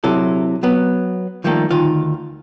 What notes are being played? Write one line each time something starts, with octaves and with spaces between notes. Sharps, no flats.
C3 F#3 E4 A4
F#3 B3
D#3 F3 G3 A3 A#3 A4
D2 D#3 F4